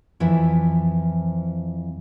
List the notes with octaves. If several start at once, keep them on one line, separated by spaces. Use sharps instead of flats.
F2 E3 F3 E4 E5